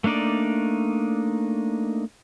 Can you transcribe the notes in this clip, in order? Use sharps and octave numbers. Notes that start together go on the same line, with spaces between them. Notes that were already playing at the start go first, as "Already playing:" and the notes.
A3 A#3 D4 D#4 D5